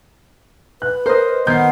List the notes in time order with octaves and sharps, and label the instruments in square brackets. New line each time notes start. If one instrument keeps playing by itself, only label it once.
[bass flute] B4 [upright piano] F#6
[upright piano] A#4 [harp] C5 D#5
[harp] D#3 [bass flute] B3 [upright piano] G6 C7